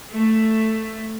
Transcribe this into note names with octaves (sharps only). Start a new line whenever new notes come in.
A3